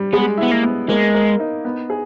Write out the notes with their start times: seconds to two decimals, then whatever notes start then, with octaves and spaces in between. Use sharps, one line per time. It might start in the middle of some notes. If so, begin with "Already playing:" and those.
Already playing: G3
0.13 G#3 B3
0.37 B3 E4
0.51 A#3
0.63 B3
0.88 G#3 A#3
1.14 A#4
1.40 D#4
1.65 B3
1.90 G#4